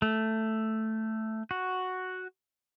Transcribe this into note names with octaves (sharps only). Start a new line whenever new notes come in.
A3
F#4